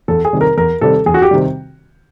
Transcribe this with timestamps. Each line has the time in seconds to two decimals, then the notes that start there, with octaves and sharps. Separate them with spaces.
0.08 E2 A4
0.25 G#4
0.33 C3 D#3 G3
0.41 A#4
0.57 E2 A#4
0.81 C3 D#3 G3 A4
1.06 E2 G#4
1.14 F#4
1.22 G4
1.31 C3 D#3 G3